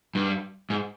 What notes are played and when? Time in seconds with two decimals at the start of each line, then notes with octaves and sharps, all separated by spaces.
0.15 G2
0.70 G#2